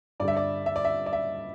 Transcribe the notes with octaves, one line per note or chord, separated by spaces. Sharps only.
G2 D3 G3 D5
E5
D5
E5
D5
E5
D5
E5